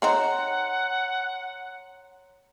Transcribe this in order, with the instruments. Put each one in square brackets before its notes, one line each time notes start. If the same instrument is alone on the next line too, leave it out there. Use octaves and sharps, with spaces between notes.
[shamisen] C4 D#4 G#4 [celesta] C#5 A#5 C6 [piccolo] F#5